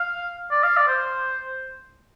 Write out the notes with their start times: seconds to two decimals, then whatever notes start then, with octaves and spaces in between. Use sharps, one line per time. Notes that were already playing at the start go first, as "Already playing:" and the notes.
Already playing: F5
0.51 D5
0.64 F5
0.77 D5
0.88 C5